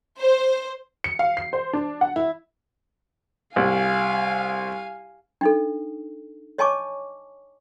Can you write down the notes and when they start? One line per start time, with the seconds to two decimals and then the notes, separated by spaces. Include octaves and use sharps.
0.21 C5
1.04 C#7
1.19 F5
1.37 C7
1.53 C5
1.73 D4
2.01 F#5
2.16 E4
3.56 C2 F5 G#5
5.41 D4 D#4 A4
6.58 C#5 D#5 G#5 A5 C#6 D6